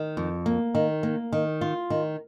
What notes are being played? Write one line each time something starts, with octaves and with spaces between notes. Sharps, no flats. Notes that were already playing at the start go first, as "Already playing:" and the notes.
Already playing: D#3
F2
A#3
D#3
A#3
D#3
F4
D#3